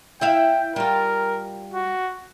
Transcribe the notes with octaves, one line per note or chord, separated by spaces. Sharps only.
E4 E5 F5 G5
G3 F4 A#4
F#4